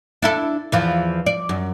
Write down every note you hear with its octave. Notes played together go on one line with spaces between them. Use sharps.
D4 E4 A4
E2 E3 F3
D5
F#2